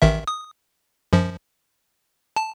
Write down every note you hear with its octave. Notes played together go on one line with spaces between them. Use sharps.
A1 D#3 E5
D#6
F#2 F3
A5